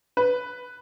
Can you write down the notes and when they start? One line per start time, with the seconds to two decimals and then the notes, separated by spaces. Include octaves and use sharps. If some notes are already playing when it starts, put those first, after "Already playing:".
0.17 B4